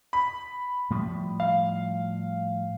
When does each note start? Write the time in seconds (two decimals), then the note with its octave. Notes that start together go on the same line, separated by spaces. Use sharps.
0.13 B5
0.90 A2 F3 G3
1.40 F5